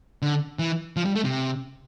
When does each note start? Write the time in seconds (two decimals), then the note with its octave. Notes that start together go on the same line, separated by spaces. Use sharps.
0.22 D3
0.59 E3
0.97 F3
1.06 G3
1.15 A3
1.25 C3